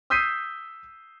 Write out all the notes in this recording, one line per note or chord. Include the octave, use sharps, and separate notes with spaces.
D#6 E6 G6 B6 C7 D#7